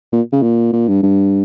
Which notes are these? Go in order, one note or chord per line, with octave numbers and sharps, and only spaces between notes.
A#2
C#3
A#2
A#2
G2
G2